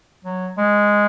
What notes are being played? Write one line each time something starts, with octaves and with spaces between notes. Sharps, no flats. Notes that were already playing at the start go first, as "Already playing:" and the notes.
F#3
G#3